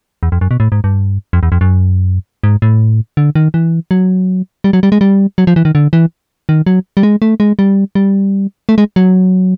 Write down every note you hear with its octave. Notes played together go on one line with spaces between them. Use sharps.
E2
F2
F#2
B2
A2
G#2
G2
F2
E2
F2
F#2
G#2
A2
D3
D#3
E3
F#3
G3
F#3
G3
G#3
G3
F#3
F3
E3
D#3
D3
E3
D#3
F#3
G3
G#3
A3
G#3
G3
G3
A3
G#3
F#3